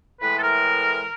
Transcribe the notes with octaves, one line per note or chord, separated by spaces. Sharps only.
A2 E3 G#3 B4
A4
A#4